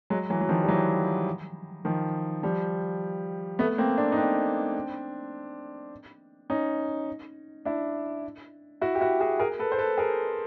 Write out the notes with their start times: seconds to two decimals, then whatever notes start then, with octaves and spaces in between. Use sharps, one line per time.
0.10 F#3 G#3
0.30 E3 F#3
0.41 F#3
0.49 D#3 F3
0.63 G3
0.68 E3 F#3
1.85 D#3 F3
2.43 F3 G3
3.59 A3 B3
3.78 A#3 C4
3.98 C4 D4
4.12 D#4
4.17 C4 D4
6.50 C#4 D#4
7.65 D4 E4
8.82 E4 F#4
8.95 G4
9.01 E4 F#4
9.20 F#4 G#4
9.39 G#4 A#4
9.59 A4 B4
9.72 C5
9.79 A4 B4
9.98 G#4 A#4